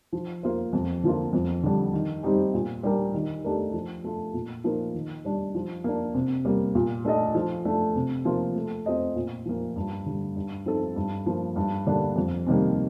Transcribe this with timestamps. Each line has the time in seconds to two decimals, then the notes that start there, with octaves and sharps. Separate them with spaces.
0.13 F3
0.43 A#3 F4 C5
0.73 F2
1.03 D3 F3 A#3 F4
1.33 F2
1.63 D3 G3
1.94 D#3
2.23 G3 C4 D#4 G4
2.54 A#2
2.83 G3 D4 G4 A#4
3.14 D#3
3.44 A3 D4 G4 A#4
3.73 F3
4.04 A3 D4 F4
4.34 A#2
4.64 F3 A#3 D#4 A#4
4.94 D#3
5.25 G3 D4
5.55 F3
5.84 A#3 D4
6.14 C3
6.45 G3 A#3
6.75 A#2
7.05 A3 D4 A4 D#5
7.35 F3
7.65 A3 D4
7.95 C3
8.25 F3 A#3 F4
8.56 A3
8.86 C4 F4 C5 D#5
9.16 A#2
9.45 F3 A#3
9.76 G2
10.06 D3 G3
10.36 G2
10.66 F3 C4 D#4 A4
10.96 G2
11.26 F3 A#3
11.56 G2
11.86 D3 G3 A#3 D4
12.16 F2
12.47 C3 D#3 G3 A#3